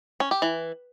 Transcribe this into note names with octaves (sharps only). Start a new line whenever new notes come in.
C#4
G4
E3